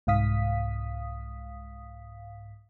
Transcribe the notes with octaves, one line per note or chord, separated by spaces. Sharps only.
C2 G#2 F5 D#6 B6